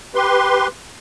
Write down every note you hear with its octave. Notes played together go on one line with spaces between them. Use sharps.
G4 B4 C6